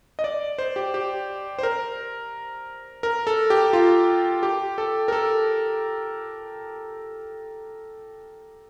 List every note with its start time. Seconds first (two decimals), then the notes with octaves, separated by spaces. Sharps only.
0.19 D#5
0.24 D5
0.58 C5
0.76 G4
0.94 G4
1.59 C5
1.63 A#4
3.03 A#4
3.27 A4
3.50 G4
3.73 F4
4.43 G4
4.78 A4
5.08 A#4
5.12 A4